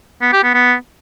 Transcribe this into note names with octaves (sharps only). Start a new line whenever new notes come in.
B3
G4
B3
B3